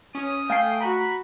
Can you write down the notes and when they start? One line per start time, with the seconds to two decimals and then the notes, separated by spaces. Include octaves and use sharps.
0.15 C#4 D#6
0.50 A3 F5 G5 G#5 C7
0.81 F#4 A#5 B5